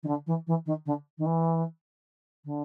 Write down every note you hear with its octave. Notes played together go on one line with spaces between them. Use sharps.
D#3
D3
E3
E3
D#3
D3
D#3
E3
D3